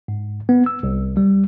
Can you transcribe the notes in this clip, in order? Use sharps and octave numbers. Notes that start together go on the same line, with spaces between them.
G#2
B3
E6
C2
G3